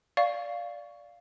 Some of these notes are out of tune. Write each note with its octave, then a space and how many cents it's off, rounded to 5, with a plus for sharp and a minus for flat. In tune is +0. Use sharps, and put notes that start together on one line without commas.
D5 -10 F5 +0 C#6 +10